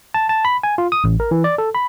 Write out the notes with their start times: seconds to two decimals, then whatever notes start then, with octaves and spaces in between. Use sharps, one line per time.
0.14 A5
0.29 A5
0.45 B5
0.63 G#5
0.78 F4
0.92 D#6
1.04 A1
1.20 A#4
1.31 E3
1.44 D5
1.58 A4
1.75 B5